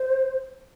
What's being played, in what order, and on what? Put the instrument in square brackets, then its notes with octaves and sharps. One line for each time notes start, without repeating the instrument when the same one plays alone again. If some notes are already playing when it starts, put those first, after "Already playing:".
Already playing: [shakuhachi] C5